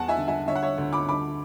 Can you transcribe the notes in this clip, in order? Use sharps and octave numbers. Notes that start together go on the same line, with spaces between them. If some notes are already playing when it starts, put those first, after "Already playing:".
Already playing: E2 F#5 A5
E5 G#5
D3
E5 G#5
D3 C#5 E5
F#5
C#5 E5
D2
B5 D6
D3 B5 D6